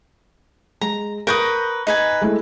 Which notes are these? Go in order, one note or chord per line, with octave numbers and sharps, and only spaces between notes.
G#3 A#5
A#4 B4 C#6 D#6 G6 A#6
D#4 B4 G#5
G#3 A3 E4